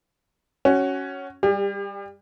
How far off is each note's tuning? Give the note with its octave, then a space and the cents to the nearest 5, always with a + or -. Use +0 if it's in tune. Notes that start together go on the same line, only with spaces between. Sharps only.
C#4 +0 F#4 +15
G3 +15 G4 +40